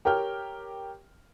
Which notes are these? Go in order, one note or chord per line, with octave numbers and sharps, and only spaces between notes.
G4 A#4 C#5 G5 F6